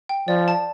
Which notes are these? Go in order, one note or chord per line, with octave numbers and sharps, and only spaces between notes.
G5
F3 D5
A5